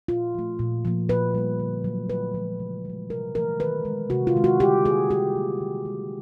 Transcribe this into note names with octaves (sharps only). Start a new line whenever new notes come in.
A#2 F4
F3 A3
A#2
F3 A#3
A#2 B4
G3 A#3
D3
F#3 A3
A#2 B4
F3 G#3
C#3
F3 G#3
C3 A#4
E3 A3 A#4
D#3 B4
G#3
C3 F#4
F4
D#3 G#3
F#4
D3 G4
G3 A#3 G#4
D#3 G4
F#3 A#3
D#3
G#3